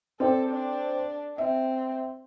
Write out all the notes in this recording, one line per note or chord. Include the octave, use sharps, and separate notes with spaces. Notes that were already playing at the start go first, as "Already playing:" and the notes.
C4 A4 D5 G5
D4
C4 E5